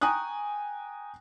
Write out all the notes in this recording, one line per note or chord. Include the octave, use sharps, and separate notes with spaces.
G5 G#5 A#5 C#6 D#6 F#6